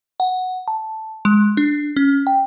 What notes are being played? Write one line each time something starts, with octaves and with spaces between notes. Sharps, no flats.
F#5
A5
G#3
D4
C#4
G5